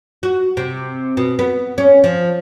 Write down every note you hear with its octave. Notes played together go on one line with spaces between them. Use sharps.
F#4
C3
B2
B3
C#4
F3